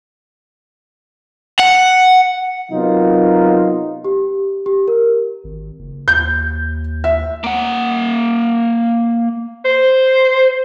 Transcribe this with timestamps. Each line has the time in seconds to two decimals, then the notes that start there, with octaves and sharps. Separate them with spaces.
1.60 F#5
2.72 C3 F#3 B3 D#4 F4 A#4
4.05 G4
4.66 G4
4.88 A#4
5.44 G#1
5.79 F#1
6.08 D#2 G6
7.04 E5
7.44 A#3 F#5
9.65 C5